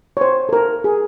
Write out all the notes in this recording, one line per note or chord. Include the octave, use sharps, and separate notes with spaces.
C#5
C5
A4
A#4
G#4